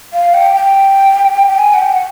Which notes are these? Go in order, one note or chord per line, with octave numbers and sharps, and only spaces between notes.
F5
G5
G5
G5
G#5
F#5
G5
F#5